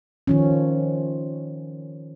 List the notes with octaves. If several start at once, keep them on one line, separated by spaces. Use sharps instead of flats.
D#3 F3 C#4